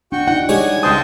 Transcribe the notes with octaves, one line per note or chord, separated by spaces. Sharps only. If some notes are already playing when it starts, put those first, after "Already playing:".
D4 F#4 G5 C#6
D#4 E4 F#5
G3 G#3 C#5 G#5
C#2 C5 G5 A5 D#6